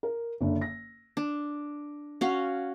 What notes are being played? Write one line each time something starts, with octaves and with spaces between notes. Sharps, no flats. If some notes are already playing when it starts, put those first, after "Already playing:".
A#4
F#1 D3
A#6
D4
C#4 F#4 F5